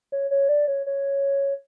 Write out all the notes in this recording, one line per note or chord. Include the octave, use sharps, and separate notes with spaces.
C#5
C#5
D5
C#5
C#5